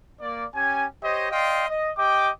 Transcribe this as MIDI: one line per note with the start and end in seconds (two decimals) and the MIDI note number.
0.20 0.45 58
0.20 0.45 74
0.54 0.85 61
0.54 0.85 67
0.54 0.85 80
1.02 1.28 67
1.02 1.28 72
1.02 1.28 73
1.02 1.28 75
1.32 1.64 74
1.32 1.64 75
1.32 1.64 77
1.32 1.64 79
1.32 1.64 84
1.68 1.91 75
1.97 2.30 67
1.97 2.30 75
1.97 2.30 79
1.97 2.30 86